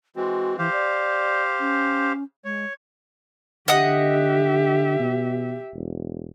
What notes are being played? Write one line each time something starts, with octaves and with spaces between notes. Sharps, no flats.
E3 G#3 C4 F#4
E3 G4 C5 F5
D5
C#4
G#3 C#5
D3 G4 D#5 E5 F#5 D#6
B2
E1